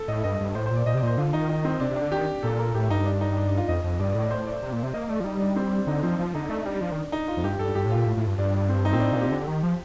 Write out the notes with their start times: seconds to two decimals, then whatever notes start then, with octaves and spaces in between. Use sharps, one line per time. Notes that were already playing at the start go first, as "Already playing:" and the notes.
Already playing: A4
0.08 A2 D#5
0.24 G2 D#5
0.34 D#5
0.40 G2
0.55 A2 C5
0.66 C5
0.70 A#2
0.76 D5
0.86 A#2 D#5
0.94 C3
0.97 D5
1.03 A#2 C5
1.18 D3 F4
1.33 D#3 D#4
1.49 D#4
1.65 C4
1.80 C3 D4
1.91 C3
1.96 D4
2.02 D3
2.12 D#3 G4
2.43 A#2 A4
2.59 A#4
2.74 A2 G4
2.90 G2 D#4
3.06 D4
3.21 D#4
3.37 D4
3.48 D4
3.58 F4
3.68 F2 D#5
3.84 F2
3.99 G2 D5
4.10 D5
4.15 A2
4.20 D5
4.31 C5
4.47 D5
4.62 C3
4.72 A#2
4.83 C3
4.93 A#3 D#5
5.09 A3 D5
5.20 F3
5.24 G3 D#4
5.40 D4
5.56 C4
5.72 D4
5.87 D3 D#4
6.03 F3 C4
6.19 F3
6.34 D3 D#4
6.49 A3 D4
6.66 G3 D4
6.81 F3
6.92 D#3
7.12 D#4
7.28 F4
7.37 F2
7.44 G2 G4
7.59 G2 A4
7.75 G2 G4
7.85 A2
7.91 A#2 F4
8.06 A2
8.17 A2
8.27 G2
8.38 G2 D4
8.54 D4
8.69 C4
8.85 D#4
8.93 A#2 C4
9.00 A2 D4
9.10 C3 F4
9.16 A#2
9.21 G4
9.26 C3
9.31 D3
9.47 D#3
9.63 F3